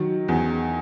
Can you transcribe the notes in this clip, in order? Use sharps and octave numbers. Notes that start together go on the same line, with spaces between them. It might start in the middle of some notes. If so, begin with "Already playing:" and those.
Already playing: D#3 F#3
E2